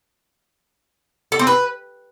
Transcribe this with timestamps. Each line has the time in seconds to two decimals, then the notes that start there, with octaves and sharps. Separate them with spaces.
1.32 A4
1.39 C4
1.47 B4